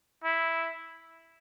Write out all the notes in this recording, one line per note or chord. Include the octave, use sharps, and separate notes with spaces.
E4